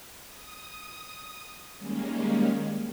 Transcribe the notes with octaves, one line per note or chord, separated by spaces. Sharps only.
D#6
D#3 G3 G#3 A#3 C#4